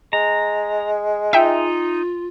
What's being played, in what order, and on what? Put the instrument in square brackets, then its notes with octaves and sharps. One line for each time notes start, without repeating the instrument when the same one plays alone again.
[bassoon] G#3 [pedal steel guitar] A#5
[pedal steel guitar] D#4 [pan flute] F4 [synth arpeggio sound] E5 G5